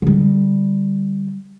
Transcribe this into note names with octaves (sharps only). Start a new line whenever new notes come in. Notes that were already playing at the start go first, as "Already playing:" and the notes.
D3 G3